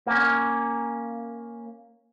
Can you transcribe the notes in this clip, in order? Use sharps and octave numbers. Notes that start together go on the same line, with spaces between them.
A#3 C#4